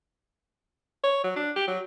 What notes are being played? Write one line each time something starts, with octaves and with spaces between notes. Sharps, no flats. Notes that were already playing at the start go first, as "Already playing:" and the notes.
C#5
F#3
D4
G4
F#3